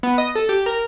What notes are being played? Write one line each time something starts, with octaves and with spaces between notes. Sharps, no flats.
B3
D#5
A4
G4
A#4